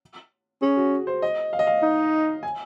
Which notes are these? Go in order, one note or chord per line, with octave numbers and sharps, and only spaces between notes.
C#4 G#4
F#4
C5
D#5
F5
D#5
F5
D#4
G#5